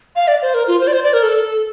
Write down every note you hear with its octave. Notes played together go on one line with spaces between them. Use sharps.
F5
D5
C5
A#4
F4
C5
D5
C5
D5
A#4
A4